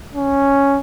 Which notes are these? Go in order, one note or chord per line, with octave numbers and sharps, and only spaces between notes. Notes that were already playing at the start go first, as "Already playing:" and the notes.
C#4